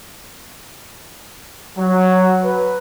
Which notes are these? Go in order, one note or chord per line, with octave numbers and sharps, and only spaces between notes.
F#3
B4